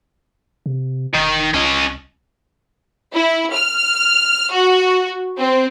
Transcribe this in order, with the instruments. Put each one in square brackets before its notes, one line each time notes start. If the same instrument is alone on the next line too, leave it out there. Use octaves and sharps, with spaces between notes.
[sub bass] C3
[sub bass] E1 [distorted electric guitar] D#3
[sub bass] C2 [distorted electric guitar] C#4 D#5
[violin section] E4
F6
F#4
C4